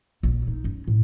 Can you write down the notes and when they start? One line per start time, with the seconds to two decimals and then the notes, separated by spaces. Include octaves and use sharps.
0.23 A#1
0.47 D#4
0.64 F#2
0.88 A2